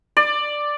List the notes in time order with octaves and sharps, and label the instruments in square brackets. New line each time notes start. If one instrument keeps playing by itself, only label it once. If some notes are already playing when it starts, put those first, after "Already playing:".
[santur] D5